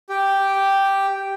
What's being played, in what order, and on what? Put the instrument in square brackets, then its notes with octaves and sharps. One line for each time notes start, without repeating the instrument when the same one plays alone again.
[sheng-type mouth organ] G4